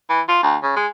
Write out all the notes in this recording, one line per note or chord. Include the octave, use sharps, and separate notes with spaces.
E3
F4
D2
C#3
G#3